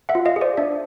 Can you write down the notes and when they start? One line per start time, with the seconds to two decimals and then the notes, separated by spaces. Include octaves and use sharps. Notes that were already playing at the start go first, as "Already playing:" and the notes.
0.09 E5 F#5
0.15 F4
0.25 D#5 F5
0.36 G#4
0.41 C5 D5
0.57 D4 D5 E5